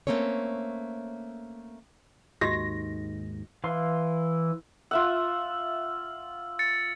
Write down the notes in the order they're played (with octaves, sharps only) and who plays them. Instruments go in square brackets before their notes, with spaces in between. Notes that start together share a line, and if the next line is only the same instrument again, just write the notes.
[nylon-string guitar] A3 A#3 C4 C#4 C#5
[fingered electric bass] D#2 G#2 D#3 [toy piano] F#4 G4 D#5 [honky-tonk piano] A#6
[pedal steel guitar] E3 F5 C6
[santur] F4 E5 F#5 [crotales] E6
[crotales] A6 C#7